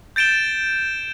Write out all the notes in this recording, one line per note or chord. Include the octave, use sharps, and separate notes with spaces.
G6 A6 D7 E7 G7